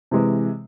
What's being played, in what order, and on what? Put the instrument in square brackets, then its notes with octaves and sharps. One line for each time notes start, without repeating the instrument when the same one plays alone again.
[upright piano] C3 E3 G#3